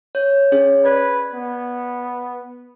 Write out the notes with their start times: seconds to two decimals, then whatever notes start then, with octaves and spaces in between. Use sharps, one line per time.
0.15 C#5 G6
0.52 C#4 G#4 C#5
0.85 B4 D5 G#6
1.33 B3